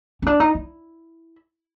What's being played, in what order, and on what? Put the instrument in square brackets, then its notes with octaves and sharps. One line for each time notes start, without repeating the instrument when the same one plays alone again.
[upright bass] C#4
D4
D#4
E4